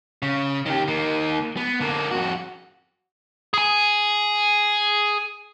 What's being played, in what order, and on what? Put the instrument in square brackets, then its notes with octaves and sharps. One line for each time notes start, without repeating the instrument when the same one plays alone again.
[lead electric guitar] C#3
D#3 G4
D#3 A#3
B3
D3 A#3
F2 F#4
G#4 G#5